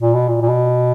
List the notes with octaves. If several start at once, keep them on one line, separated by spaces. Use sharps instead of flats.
A#2
B2
A#2
A#2
B2